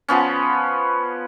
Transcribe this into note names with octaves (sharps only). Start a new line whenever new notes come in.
F3 B3 C#4